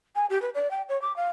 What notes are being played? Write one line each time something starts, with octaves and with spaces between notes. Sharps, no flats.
G#5
G4
B4
D5
G5
C#5
D6
F5